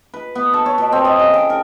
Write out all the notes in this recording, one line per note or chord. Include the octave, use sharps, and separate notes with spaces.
B4
B3
A4
C#5
B2
C4
D#5
C#3
G5
A#4